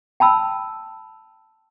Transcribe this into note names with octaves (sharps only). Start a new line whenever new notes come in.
G5 A5 B5 E6